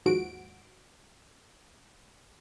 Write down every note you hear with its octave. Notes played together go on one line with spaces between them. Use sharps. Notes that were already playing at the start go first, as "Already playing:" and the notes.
D#2 G#2 F3 F#4 D7